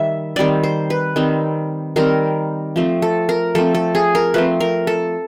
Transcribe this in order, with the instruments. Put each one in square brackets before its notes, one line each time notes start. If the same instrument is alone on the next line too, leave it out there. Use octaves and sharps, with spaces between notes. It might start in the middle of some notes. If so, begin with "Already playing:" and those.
Already playing: [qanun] D#3 G3 E5
D#3 G3 C4 D5
C5
B4
D#3 G3 C4
D#3 G3 C4 A#4
F3 A3 C4
A4
A#4
F3 A3 C4 A4
A4
G#4
A#4
F3 A3 C4 B4
A#4
A4